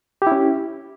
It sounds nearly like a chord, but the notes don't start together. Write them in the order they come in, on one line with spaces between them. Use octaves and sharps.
G4 E4 C#4